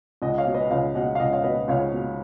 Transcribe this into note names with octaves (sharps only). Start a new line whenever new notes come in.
C#2 D#5 F#5
C#5 F5
B2
B4 D#5
C#2 C#5 F5
B2 D#5 F#5
F5
C#2 D#5 F#5
C#5 F5
B2 B4 D#5
C#2 C#5 F5
B2